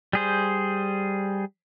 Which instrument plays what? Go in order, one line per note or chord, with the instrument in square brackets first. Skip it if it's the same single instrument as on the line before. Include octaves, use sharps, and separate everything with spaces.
[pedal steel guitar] G3 G#4 C5